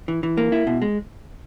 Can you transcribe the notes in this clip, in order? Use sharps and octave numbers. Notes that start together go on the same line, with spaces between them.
E3
E3
A#3
E4
B2
G#3